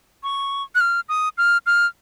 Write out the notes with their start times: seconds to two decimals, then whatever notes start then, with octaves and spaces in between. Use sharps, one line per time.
0.23 C#6
0.75 F#6
0.80 F6
1.09 D#6
1.38 F6
1.66 F6